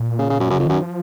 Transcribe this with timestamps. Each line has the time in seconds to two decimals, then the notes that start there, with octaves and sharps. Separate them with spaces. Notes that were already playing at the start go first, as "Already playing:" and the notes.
Already playing: A#2
0.18 C#3
0.30 C#3
0.40 F#2
0.50 F#2 C#3
0.59 F2
0.66 F#2 D#3
0.82 F3